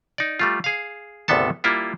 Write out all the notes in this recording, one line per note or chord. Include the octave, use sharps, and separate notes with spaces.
D#4 D5
G3 A3 F4
G#4 F5
G#1 D2 C3 B3 A4 A5
G3 A#3 E4 F4